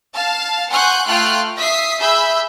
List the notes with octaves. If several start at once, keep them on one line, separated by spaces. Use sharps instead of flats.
F5 A5 A6
F#5 G#5 C6 C#6 F#6 G6
A3 F4 G5 C6 F6 F#6
E5 D#6 B6 C7
G#4 E5 B5 E6 G6 B6